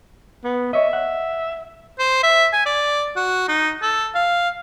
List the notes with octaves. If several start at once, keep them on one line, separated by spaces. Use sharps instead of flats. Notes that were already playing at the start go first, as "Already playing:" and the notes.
B3
C#5 D#5 E5
F#5
C5
E5
G#5
D5
F#4
D#4
A4
F5